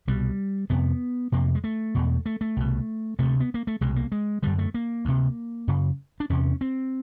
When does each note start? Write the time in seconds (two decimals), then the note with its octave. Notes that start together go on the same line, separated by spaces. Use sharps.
0.07 C2 B2 G3
0.70 F2 C3 B3
1.32 F2 C3 A#3
1.55 G#3
1.64 A3
1.95 E2 B2
2.26 A3
2.41 A3
2.57 C2 B2
3.19 D2 C3 A3
3.40 B3
3.54 A#3
3.67 A3
3.81 C2 B2 G#3
3.96 A#3
4.12 G#3
4.43 F#2 D3 G3
4.58 A3
4.74 A#3
5.05 D2 C3
5.68 F#2 C#3
6.20 D4
6.30 E2 C3 C#4
6.61 C4